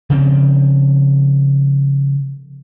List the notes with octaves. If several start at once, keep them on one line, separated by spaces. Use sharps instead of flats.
C#3 F3 C4